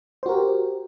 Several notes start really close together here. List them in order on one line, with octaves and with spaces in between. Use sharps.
C5 F#4 A#4 G4